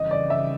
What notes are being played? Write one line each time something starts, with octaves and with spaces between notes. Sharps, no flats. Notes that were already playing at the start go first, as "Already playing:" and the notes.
Already playing: F2 C#3 E3 G3 D#5
D5
E5